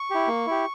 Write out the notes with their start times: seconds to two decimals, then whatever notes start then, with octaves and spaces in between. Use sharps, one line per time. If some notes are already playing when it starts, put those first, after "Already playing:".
Already playing: C#6
0.10 E4 G4
0.28 A#3
0.47 E4 G4